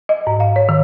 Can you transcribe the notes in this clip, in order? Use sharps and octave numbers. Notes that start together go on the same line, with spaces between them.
D#5
G#2
F5
C#5
D#3